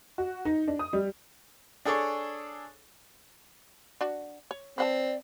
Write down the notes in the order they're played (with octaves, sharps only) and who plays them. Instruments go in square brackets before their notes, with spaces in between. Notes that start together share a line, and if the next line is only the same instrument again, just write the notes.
[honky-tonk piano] F#4
D#4
D4
D#6
G3
[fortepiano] D4 G#4 A4 C#5 D5
[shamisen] D4 F#4
C#5
[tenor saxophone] C4 [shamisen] B4 F#5 A5 [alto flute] D5